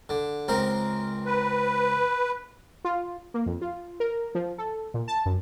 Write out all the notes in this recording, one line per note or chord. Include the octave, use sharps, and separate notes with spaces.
D3
C#2 C4 A#4
B4
F4
A#3
F2
F4
A#4
F3
A4
A#2
A5
F#2